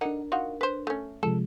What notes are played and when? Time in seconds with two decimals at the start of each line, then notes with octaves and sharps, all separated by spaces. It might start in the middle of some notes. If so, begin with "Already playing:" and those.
0.01 D3 D4 D#4 A#4 F#5
0.32 D#4 F4 F#4
0.61 B4 C5
0.87 A3 C#4
1.23 C3 F3 G#3 A4